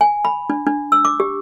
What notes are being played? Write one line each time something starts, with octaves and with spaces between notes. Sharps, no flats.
G#5
B5
D4
D4
E6
D6
G4